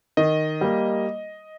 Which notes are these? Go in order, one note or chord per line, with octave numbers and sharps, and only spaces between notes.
D#3 D#5
G3 A#3